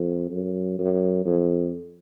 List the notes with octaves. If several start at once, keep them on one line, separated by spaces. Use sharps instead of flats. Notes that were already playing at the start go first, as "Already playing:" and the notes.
Already playing: F2
F#2
F#2
F2